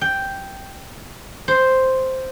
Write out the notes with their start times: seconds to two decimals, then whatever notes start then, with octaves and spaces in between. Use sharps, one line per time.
0.01 G5
1.48 C5